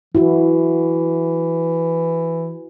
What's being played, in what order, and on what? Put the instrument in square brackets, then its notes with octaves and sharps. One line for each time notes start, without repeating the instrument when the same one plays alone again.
[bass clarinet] E3 [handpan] E4 F#4